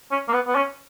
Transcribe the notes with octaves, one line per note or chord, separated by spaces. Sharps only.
C#4
A#3
B3
B3
C#4